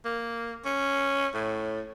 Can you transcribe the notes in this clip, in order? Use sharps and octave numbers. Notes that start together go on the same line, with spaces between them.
A#3
C#4
A2